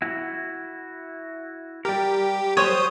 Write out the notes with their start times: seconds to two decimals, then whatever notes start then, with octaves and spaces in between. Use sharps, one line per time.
0.02 E4 F#4
1.85 G3 G4 A#4
2.57 F#3 G3 C5 C#5 D#6